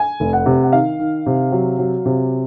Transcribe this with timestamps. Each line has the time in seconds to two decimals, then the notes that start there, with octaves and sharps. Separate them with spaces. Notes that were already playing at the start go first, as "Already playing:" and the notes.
Already playing: G#5
0.20 F1
0.33 F#5
0.46 C3
0.63 F#5
0.72 D#3 F5
0.99 D#3
1.26 C3
1.52 F#3
1.79 F#3
2.06 C3